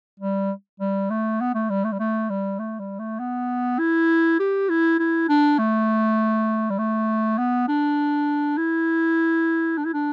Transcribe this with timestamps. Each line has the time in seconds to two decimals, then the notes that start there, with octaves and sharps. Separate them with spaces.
0.20 G3
0.80 G3
1.10 A3
1.41 B3
1.55 A3
1.70 G3
1.84 A3
1.92 G3
2.00 A3
2.30 G3
2.59 A3
2.79 G3
2.99 A3
3.19 B3
3.79 E4
4.40 G4
4.69 E4
4.99 E4
5.29 D4
5.59 A3
6.70 G3
6.79 A3
7.38 B3
7.68 D4
8.58 E4
9.78 D4
9.85 E4
9.94 D4